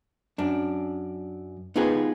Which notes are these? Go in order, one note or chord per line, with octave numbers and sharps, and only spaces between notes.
F#2 D4
B3 D#4 F4 G4 G#4 B4